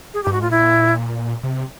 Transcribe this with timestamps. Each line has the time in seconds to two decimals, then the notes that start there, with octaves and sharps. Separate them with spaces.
0.14 G#4
0.23 G2 G4
0.32 G#2 F#4
0.41 A2 F4
0.50 A#2 E4
1.43 C3